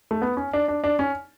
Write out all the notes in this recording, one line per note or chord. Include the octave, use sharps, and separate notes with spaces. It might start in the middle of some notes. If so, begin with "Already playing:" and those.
A3
B3
C#4
D4
D4
D4
C#4